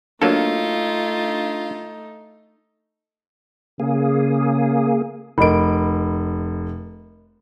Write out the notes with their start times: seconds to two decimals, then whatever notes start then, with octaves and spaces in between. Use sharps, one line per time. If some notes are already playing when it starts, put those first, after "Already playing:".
0.22 F#3 A3 A#3 D4 D#4 F4 A4
3.80 C#3 A#3 G#4
5.38 F1 A#4 D#5 B5 D7